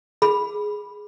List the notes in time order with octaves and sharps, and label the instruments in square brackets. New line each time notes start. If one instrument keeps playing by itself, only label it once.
[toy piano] G#4 B5